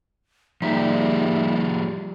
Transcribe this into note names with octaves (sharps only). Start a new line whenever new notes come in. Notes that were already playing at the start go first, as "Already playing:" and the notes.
F3 G3 A#3 D#4 G4 G#4 E5